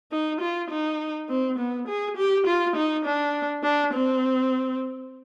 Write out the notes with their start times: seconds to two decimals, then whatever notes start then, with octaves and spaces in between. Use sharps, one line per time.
0.12 D#4
0.40 F4
0.70 D#4
1.29 C4
1.58 B3
1.88 G#4
2.17 G4
2.46 F4
2.76 D#4
3.05 D4
3.63 D4
3.93 C4